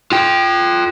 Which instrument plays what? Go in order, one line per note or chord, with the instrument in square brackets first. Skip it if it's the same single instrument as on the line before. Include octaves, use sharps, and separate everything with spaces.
[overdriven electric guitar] F4 G5